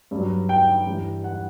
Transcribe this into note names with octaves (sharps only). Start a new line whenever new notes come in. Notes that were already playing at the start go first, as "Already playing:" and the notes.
G2 F#3
G5
G2 E3 G3
F#5